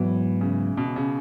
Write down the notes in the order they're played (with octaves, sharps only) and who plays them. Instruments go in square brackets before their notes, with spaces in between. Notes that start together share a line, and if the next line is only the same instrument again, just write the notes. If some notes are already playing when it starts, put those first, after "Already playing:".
Already playing: [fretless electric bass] G#2 F#3 B3 [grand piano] E3
[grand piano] C#3
B2
C#3